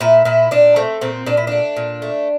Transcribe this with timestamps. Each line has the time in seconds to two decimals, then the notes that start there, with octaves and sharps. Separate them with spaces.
0.01 A#2 E4
0.25 A#2 E4
0.51 A#2 D4
0.76 A3 C4
1.01 A#2 C4
1.26 A#2 D4
1.37 E4
1.47 A3 D4
1.76 A#2
2.02 A3